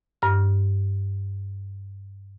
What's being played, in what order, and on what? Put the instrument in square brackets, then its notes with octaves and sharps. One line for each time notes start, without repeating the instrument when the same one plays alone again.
[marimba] G2 F6